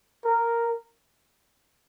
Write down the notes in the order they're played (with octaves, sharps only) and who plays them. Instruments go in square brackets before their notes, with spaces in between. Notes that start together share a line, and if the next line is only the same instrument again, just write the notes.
[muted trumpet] A#4